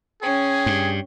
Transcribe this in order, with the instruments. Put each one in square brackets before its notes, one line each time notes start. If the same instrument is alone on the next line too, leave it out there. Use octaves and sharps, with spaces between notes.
[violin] C#4 [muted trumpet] G#4 [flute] G5
[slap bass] G2